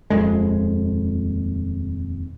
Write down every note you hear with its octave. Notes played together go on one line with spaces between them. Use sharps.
D#1 F2 G#3